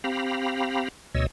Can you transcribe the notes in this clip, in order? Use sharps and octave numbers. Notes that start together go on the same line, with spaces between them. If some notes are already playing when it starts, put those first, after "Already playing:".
C4 G4 F5 A#5 B5
D2 B2 C#5 D#5 E6